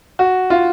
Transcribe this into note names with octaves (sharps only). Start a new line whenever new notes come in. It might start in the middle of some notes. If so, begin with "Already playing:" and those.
F#4
F4